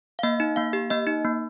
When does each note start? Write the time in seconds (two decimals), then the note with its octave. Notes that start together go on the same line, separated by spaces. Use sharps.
0.19 F5
0.23 A#3 D#5
0.40 D#4
0.56 A#3 F5
0.73 G4
0.90 A#3 D#5
1.07 D#4
1.25 A#3